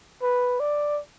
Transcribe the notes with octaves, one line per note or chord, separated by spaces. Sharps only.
B4
D5